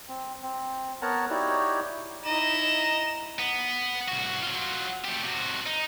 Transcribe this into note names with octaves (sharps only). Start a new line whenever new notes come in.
C4
C4
B3 A#4 C#5 F#5 A5 A#5
D#4 E4 F#4 G4 C#5 D5
D#4 E4 D#5 A#5 E7
B3
C2 F#4
F#3 F4
A3 G4
C3 F#4
D#4